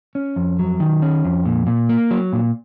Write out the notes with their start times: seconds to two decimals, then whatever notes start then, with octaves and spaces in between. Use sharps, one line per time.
0.15 C#4
0.36 F2
0.59 F#3
0.80 D#3
1.02 C#4
1.24 F2
1.46 A#2
1.67 A#2
1.89 A#3
2.11 F#3
2.33 A#2